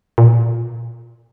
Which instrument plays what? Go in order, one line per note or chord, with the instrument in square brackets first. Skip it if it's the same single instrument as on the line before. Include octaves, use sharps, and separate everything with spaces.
[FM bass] A#2